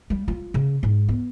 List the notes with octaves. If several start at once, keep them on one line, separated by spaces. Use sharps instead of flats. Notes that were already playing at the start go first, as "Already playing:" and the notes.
G3
F4
C#3
G#2
B3